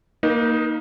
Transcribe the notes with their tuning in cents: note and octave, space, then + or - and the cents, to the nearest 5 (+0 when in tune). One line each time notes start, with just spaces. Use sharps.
A#3 +0 D#4 +0 B4 -45